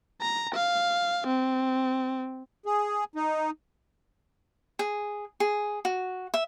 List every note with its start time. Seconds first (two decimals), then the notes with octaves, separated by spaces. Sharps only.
0.21 A#5
0.54 F5
1.27 C4
2.66 G#4
3.16 D#4
4.79 G#4
5.40 G#4
5.85 F#4
6.34 E5